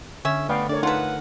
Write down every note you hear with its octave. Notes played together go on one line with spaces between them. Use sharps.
D3 C#4 E5
A3 B3 D5 F5 G5
D4 A4 A#4 C#5 D5
D#4 F4 B4 F#5 A5